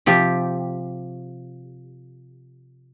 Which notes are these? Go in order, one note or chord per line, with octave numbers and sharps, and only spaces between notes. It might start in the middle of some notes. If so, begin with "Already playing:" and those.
C3 F3 G4